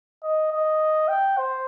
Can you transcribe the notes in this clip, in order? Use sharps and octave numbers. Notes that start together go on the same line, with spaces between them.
D#5
D#5
G5
C5